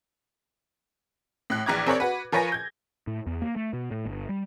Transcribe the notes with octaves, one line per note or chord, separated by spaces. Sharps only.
A2 F#6
A#1 E3 A#5 D6 G#6
C4 A#4 C#5 D5
F#4 B4
F3 A#4 B4 C#5 G#5 A#6
G6 G#6
A2
E2
A#3
A3
B2
A2
G1
G3